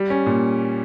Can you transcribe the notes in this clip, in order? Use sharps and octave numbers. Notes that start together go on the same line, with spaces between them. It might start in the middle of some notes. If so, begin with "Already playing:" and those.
Already playing: G3
C#4
A#2